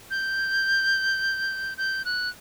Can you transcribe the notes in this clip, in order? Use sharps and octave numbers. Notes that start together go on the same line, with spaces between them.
G6
G6
F#6